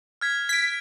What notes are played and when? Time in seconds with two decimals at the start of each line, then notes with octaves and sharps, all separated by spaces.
0.21 F6 G#6 B6
0.49 G#6 B6 D7